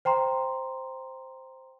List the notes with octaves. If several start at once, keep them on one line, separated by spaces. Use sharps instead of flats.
C5 G5 A#5 C6